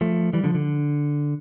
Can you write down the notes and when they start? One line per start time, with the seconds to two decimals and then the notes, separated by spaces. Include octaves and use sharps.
0.01 F3 A3
0.33 E3 G3
0.44 D3 F3
0.54 D3